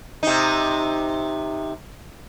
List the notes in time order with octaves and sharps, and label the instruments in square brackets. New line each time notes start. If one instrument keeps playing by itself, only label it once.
[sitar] C3 D#4